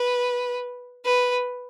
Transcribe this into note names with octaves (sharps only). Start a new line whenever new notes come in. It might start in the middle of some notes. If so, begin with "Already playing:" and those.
Already playing: B4
B4